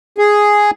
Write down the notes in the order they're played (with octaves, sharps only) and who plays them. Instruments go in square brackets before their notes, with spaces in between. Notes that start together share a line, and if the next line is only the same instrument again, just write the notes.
[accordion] G#4